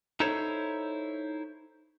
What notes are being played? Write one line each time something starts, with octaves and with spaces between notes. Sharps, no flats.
D#4 E4 A4 C5 C#5